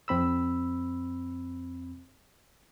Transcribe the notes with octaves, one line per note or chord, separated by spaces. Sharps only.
F2 C4 B5 E6